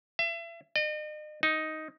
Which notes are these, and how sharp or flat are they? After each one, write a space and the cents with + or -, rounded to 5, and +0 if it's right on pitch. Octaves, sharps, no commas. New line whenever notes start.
E5 +35
D#5 -40
D#4 +5